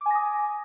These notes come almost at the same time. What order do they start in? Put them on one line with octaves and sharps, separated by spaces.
D6 G#5 A#6 D#6